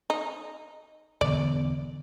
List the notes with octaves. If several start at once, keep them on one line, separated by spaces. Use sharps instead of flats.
D#4
E1 D3 B3 D5